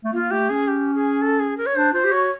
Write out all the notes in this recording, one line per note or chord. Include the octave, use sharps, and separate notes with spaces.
A3
A#3 F4
A3 G4
C#4 G#4
G4
G#4
A4
G#4
A#4
C#5
D4 C5
F4 C5
G4
F#4 C#5